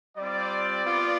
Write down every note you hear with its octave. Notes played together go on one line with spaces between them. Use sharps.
G3 C4 F4 D5
B3 F4